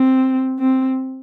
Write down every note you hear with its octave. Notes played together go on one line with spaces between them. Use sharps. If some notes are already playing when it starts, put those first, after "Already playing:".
Already playing: C4
C4